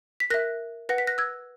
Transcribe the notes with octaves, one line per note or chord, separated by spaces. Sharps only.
B6
A#4 E5 F#6 A#6
B4 F#5 A#6
B6
F#6 A#6
E6 G#6